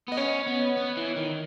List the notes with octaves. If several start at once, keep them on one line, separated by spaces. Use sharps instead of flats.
B3 D#5
C#4 C#5
B3
B3
E3
D#3